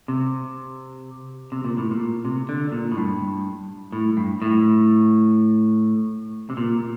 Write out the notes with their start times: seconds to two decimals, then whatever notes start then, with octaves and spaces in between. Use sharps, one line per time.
0.08 C3
1.52 C3
1.65 A#2
1.77 A2
1.91 A#2
2.25 C3
2.49 D3
2.72 A#2
2.92 A2
2.97 G2
3.92 A2
4.17 G2
4.42 A2
6.50 C3
6.57 A#2